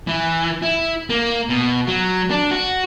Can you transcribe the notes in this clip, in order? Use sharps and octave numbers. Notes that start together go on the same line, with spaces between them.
E3
E4
A#3
B2
F#3
D4
F#4